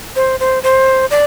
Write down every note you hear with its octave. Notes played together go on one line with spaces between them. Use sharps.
C5
C5
C5
D5